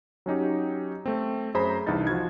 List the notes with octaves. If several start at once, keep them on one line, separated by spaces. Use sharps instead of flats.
F#3 C#4 D#4 G4
A3 C4
F#2 G#4 C5 A#5 B5
C2 E3 D4 D#4 A6
F3 F#4 G#6